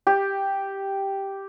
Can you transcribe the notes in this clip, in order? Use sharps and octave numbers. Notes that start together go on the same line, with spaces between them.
G4